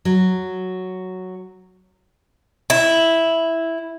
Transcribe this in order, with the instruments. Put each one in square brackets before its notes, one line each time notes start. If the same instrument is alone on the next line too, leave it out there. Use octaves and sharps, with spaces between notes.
[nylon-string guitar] F#3
[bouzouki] E4